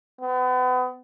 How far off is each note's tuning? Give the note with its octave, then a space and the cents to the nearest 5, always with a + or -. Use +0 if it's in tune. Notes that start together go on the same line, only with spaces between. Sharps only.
B3 +35